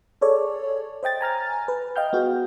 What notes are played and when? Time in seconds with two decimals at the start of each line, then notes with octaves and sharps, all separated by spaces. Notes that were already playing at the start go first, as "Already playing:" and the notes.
0.21 G#4 A4 C#5 D5
1.03 C5 D#5 G5 A6
1.21 G#5 A#5 F6 A6
1.68 B4
1.96 D#5 F5 G5 F6 G6
2.13 B3 F#4 G#4